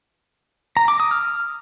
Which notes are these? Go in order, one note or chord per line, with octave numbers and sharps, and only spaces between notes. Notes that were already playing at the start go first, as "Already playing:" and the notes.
A#5
D6
D#6
F6